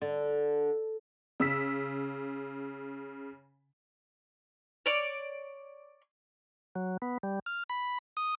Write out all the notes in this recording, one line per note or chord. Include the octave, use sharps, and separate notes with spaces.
D3
C#3 E6 B6
C#5 D5
F#3
B3
G3
F6
B5
D#6